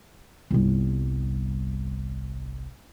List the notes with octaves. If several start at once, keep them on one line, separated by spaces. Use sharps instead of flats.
G1 C2